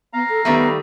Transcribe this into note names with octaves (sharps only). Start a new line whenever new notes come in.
B3 F5 A#5
A4
D#3 G3 A3 B3